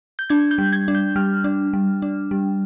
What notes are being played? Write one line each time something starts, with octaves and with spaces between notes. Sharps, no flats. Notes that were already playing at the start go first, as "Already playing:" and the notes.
G6
D4 G#6
G6
G3
G#6
D4
G6
G3 F6
D4
G3
D4
G3